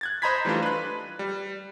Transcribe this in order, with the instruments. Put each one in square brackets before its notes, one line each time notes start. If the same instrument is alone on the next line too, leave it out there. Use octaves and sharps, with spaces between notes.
[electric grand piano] F#6 G#6 A6
C5 D#5 A#5 B5 G#6 B6
E3 G3 A3 D4 F4
B4 F#6
G3